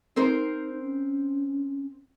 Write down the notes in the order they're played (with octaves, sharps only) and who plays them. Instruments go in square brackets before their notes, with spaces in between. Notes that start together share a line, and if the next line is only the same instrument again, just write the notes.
[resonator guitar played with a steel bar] C4 A#4 C5 [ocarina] D#4
[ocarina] C#4